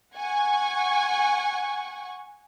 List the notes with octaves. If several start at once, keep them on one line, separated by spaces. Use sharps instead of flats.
F#5 G#5 C#6